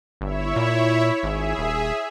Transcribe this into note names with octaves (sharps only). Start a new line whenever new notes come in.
G1 E4 C#5 E5
A#2
G#1 G#4 E5
D#1